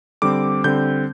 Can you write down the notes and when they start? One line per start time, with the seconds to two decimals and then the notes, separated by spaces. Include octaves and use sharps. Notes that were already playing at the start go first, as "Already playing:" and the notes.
0.22 D3 G3 C4 D6
0.64 D3 G3 C4 G6